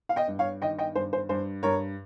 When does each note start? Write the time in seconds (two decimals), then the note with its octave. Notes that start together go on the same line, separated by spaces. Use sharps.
0.09 F5
0.16 D#5 G5
0.28 G2
0.39 C#5 F5
0.62 D#3 D#5 G5
0.78 D#5 G5
0.95 G2 C5
1.13 C5
1.29 G2 C5
1.63 G2 A#4 C#5